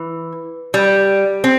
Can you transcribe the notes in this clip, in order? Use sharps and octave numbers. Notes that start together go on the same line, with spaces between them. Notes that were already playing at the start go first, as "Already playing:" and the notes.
Already playing: E3
G3
C4